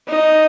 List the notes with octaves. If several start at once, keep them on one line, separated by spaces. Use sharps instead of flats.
D#4